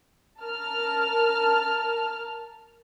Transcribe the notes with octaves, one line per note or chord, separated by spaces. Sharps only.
A#4 A5 F6